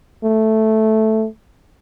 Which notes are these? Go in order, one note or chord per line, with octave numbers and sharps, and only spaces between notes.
A3